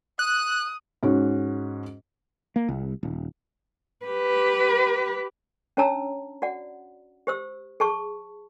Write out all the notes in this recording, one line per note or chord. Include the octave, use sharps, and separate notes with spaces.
D#6 F#6
G#2 C#4 F#4
A#3
C2
D#1
G4 B4
C#4 D4 C#5 A5 A#5 E6
F#4 D5 F#5
G4 C5 E6
G#4 A5 C#6